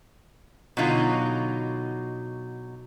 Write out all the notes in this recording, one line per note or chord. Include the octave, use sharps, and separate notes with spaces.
B2 D3 F#3 D#4 F4